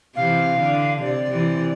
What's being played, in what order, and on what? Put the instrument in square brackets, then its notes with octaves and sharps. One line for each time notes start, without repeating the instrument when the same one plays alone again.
[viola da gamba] C3 E3 [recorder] F5
[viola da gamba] D3
[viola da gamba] C3 [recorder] D5
[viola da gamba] C3 E3